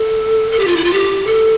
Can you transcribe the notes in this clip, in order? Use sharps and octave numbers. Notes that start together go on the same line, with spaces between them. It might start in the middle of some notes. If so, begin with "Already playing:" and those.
Already playing: A4
A4
G4
F4
E4
F4
G4
A4